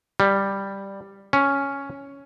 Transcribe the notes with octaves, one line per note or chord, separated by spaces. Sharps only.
G3
C#4